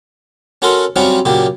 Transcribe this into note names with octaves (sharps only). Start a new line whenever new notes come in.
C#4 F#4 A4 A#4 C6
F#3 G3 C4 C#4 F4 F#4
A#2 C#3 F#3 G4